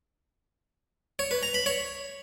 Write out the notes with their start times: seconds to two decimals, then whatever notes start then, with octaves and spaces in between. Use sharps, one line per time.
1.19 C#5
1.31 B4
1.43 A#5
1.54 B5
1.66 C#5